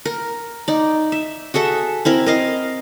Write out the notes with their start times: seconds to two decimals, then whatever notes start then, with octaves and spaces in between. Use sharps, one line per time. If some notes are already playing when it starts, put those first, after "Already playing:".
0.05 A#4
0.68 D#4 D5
1.12 E5
1.54 F#4 G#4 A4 E5
2.05 C4 E4 A#4
2.26 A#4 D#5 F5